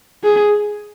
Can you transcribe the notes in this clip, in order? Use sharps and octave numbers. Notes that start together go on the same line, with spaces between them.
G#4